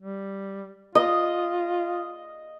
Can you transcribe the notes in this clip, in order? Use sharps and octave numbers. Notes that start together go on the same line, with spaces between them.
G3
F4 D#5